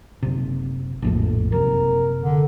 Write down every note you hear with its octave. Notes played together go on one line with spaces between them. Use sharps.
F#1 C3
A#1 F2 A2
F#1 C3 A#4
D3